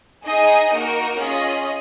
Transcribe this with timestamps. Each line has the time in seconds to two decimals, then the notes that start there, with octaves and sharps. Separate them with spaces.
0.25 D#4 G#4 D#5 G#5
0.73 A#3 D#4 F#4 A#4
1.19 C#4 F4 G#4 D#5